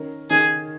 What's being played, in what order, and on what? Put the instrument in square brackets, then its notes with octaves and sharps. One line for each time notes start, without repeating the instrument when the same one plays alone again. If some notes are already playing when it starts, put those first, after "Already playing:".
Already playing: [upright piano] D#3 C#4 A#4
[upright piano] D#3 C#4 A#4 [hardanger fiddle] G#4